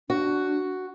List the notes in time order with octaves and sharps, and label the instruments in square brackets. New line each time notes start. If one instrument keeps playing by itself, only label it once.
[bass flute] D4 [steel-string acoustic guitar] F#4